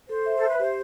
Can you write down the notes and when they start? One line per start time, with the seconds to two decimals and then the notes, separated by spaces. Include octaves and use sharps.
0.09 A4 C5
0.26 E5
0.37 A4
0.43 E5
0.49 B4
0.59 G4 C5